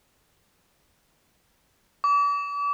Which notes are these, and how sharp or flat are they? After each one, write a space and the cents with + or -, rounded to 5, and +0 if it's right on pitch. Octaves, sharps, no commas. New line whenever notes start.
D6 -40